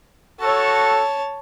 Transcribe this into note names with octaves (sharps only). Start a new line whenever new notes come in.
F#4 A4 C#5 A5